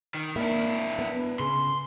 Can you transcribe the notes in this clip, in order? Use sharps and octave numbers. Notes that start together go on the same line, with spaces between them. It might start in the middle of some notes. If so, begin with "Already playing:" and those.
D#3
A#3 D4 E4
B3
C#3 C6